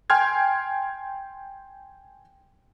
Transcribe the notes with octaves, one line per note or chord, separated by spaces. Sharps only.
G5 G#5 C6 F6 G#6